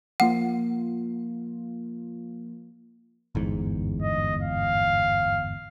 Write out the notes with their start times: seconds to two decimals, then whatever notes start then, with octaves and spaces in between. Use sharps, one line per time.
0.20 F3 A#3 F4 F#5
3.35 G1 E2 G#2
4.02 D#5
4.42 F5